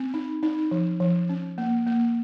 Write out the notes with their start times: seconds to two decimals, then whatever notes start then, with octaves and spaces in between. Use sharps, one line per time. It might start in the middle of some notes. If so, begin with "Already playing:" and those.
Already playing: C4
0.14 D#4
0.43 D#4
0.71 F3
1.00 F3
1.29 C#4
1.58 A#3
1.87 A#3